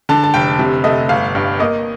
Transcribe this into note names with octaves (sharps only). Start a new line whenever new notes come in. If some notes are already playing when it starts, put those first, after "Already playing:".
D3 A5
A5
F1 G5
C3
A3 D#5
G1 F5
G2
A#3 D#5